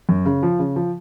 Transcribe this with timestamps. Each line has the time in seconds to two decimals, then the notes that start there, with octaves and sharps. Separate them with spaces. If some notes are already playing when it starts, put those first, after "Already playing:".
0.09 F#2
0.26 C#3
0.43 F3
0.59 C#3
0.76 F3